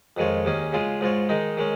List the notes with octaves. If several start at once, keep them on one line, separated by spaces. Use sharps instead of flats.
F2 D#3 G#3 F4 C#5
D#2 D#3 C#4 G#4
C#3 G#3 F4 G#4
G#2 G#3 F4 C#5
D#3 G#3 D#4
D#3 G#3 C#4